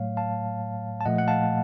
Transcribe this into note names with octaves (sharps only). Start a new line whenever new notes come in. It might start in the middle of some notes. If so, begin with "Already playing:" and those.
Already playing: A2 F#3 A3 C#5 F5
F5 A5
A5
A#2 F3 A3 D#5 F#5
F#5
F5 A5